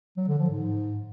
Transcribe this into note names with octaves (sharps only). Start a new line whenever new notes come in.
F#3
D3
F3
G#2